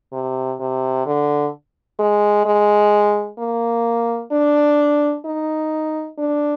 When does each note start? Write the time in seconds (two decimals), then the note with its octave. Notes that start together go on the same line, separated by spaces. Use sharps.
0.13 C3
0.60 C3
1.06 D3
1.99 G#3
2.46 G#3
3.39 A#3
4.32 D4
5.25 D#4
6.18 D4